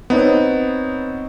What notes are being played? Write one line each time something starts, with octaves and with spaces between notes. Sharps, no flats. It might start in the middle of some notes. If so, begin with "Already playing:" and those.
B3 C4 D#4 C#5